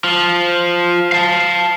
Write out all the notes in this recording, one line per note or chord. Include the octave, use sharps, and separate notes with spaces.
F3
F5 A5